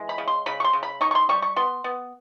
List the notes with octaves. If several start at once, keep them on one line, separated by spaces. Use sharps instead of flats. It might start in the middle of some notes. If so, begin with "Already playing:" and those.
Already playing: E3 G#3
B5
C#3
C6
C#3 B5
C#6
C6
C#3
B5
D#4 C#6
C#6
C6
G3 C#6
C#6
B3 C6
B3